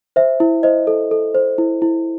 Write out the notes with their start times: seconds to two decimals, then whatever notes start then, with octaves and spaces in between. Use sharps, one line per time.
0.16 C5 E5
0.40 E4
0.63 C5 D#5
0.87 A4
1.11 A4
1.35 C5
1.58 E4
1.82 E4